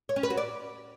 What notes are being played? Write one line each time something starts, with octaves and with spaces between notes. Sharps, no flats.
C#5
C#4
B4
F#4
D5